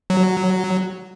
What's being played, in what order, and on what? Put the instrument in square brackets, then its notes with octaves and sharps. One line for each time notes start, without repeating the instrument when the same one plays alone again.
[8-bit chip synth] F#3